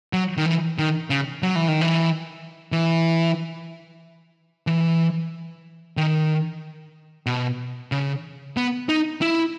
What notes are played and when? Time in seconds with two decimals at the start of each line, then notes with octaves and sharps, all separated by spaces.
0.13 F#3
0.37 D#3
0.46 E3
0.79 D#3
1.10 C#3
1.43 F#3
1.56 E3
1.68 D#3
1.81 E3
2.72 E3
4.67 E3
5.97 D#3
7.26 B2
7.92 C#3
8.57 B3
8.89 D#4
9.21 E4